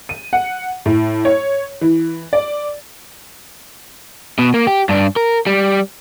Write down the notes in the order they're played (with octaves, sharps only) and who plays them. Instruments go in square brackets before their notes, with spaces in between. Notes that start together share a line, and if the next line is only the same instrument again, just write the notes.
[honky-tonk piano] D#7
F#5
A2
C#5
E3
D5
[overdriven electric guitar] B2
A#3
G4
G2 D4
A#4
G3